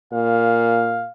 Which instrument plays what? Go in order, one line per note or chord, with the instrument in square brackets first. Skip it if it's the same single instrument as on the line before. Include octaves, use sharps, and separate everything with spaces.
[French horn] A#2 [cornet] F5